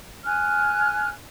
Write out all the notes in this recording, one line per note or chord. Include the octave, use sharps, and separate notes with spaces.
G#5 F6 F#6